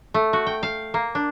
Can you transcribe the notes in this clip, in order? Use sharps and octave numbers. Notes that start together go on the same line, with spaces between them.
A3
F#4
G5
F5
A#3
D4